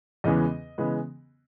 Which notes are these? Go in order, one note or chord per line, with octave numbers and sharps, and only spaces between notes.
E2 C#3 E3 G#3 B3 D#5
C#3 E3 G#3 B3